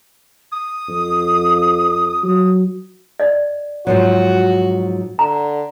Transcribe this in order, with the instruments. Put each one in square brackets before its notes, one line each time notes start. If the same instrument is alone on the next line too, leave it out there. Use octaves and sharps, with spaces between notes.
[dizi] D#6
[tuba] F2
[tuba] F#3 [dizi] D#6
[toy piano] D5 D#5
[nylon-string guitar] G#2 F3 F#3 [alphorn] F#4
[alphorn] D3 [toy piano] A#5